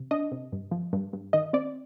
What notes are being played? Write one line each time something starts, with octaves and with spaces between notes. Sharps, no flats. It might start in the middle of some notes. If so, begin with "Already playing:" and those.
Already playing: C3
D4 D#5
C3
G2
F3
G2
G2
D#3 D#5
C4 D5